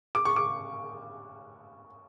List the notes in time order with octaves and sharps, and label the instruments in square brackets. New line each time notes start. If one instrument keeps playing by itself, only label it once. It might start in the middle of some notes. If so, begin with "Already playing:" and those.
[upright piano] D6
C#6
D6